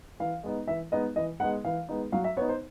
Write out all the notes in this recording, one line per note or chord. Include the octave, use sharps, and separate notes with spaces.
E3 F5
G#3 B3 D#4
E3 E5
G#3 B3 D#4 D#5
E3 D#5
G#3 B3 D#4 F#5
E3 F5
G#3 B3 D#4
F#3 F5
E5
B3 D#4 C#5
C5